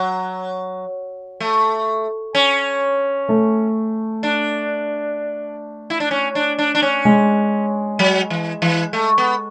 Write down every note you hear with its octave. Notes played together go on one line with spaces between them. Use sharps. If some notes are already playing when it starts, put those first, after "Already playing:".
Already playing: F#3
A3
C#4
A3
D4
E4
D4
C#4
D4
D4
D4
C#4
G#3
F#3
E3
E3
A3
B3